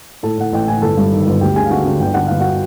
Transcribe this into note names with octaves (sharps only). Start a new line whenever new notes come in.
A2 A4 A5
A2 F#5
A1 G5
A2 G#5
G1 A4 A5
G2
D#3
G1
D2 G4 G5
D3 G#4 G#5
F5
D3 F#4 F#5
D3
G1 G5
D3 F#5
G1 F5
F#4 F#5